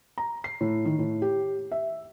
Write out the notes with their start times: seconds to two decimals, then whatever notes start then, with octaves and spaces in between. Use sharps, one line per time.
0.18 A#5
0.44 C7
0.61 A2
0.85 D#3
0.99 A2
1.22 G4
1.72 E5